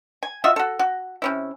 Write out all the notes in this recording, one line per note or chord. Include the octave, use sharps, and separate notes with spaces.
G#5
F4 F#4 D#5 E5
F#4 A4
F#4
C3 C#4 E4